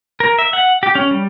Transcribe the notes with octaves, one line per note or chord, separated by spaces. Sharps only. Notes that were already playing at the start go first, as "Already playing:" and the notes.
A#4
E5
F#5
G4
C#4
G3